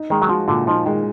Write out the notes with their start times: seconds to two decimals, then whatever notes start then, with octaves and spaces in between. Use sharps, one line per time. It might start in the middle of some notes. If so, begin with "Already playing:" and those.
Already playing: D#4
0.10 D#3 G#3
0.22 F#3
0.29 F3 F#4
0.48 A#2 D3
0.67 F3 D#4
0.86 D#3 G#3